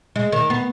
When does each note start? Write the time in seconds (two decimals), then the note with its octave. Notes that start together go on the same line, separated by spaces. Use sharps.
0.16 G#3
0.32 D#3
0.50 B3